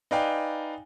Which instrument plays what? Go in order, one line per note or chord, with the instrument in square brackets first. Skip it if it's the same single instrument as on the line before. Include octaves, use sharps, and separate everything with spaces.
[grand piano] D#4 B4 D5 F5 G5 G#5